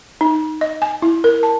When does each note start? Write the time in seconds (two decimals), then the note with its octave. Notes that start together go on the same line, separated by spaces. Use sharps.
0.21 D#4
0.61 D#5
0.82 G#5
1.02 E4
1.24 A#4
1.43 A5